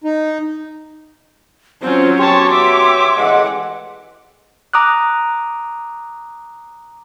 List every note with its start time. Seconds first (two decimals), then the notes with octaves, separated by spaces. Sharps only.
0.04 D#4
1.82 F#3 C4 C#4 F4 C5
2.18 B3 F#4 G4 C#5 A5 C6
2.51 C#5 E5 D6
3.17 A1 G#3 F#5
4.73 A#5 D6 D#6 F#6